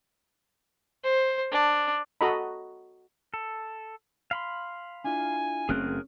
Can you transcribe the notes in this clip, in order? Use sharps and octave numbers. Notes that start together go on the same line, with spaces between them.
C5
D4
F#4 A4 D#5 A#5 B5
A4
F5 B5 C6
D4 E4 F4 G#5
F#1 A3 C4 C#4 G#4 A#4 F#6